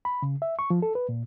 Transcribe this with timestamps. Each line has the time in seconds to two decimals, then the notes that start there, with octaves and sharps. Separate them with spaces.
0.05 B5
0.22 C#3
0.42 E5
0.59 C#6
0.70 F3
0.82 A4
0.95 B4
1.09 A#2